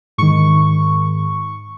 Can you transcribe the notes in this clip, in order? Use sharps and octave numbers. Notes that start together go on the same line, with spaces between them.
G#2 D#3 C#6